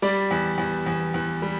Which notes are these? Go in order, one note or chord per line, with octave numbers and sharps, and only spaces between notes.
G3 D5
E2
E2
E2
E2
G3